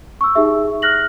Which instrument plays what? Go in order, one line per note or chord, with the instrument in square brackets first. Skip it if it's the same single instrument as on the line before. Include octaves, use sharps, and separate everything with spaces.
[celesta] C#6 E6
D#4 G4 G#4 E5
F6 F#6 A#6 F#7